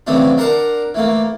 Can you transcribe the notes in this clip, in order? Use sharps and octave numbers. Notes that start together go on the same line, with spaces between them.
C#3 E3 F#3 A3 C4 D4
D4 A#4 F#5 A5 A#5 C6
E3 A3 A#3